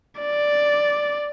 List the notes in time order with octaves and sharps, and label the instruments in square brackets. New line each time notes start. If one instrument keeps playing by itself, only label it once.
[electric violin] D5